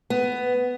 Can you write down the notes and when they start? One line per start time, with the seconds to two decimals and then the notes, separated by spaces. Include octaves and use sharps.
0.10 B3